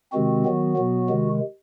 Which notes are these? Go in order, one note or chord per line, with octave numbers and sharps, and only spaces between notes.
C3 D#3 G#3 C4 F#4
D#3 F#3 B3
B2 F#3 B3
C3 D#3 G#3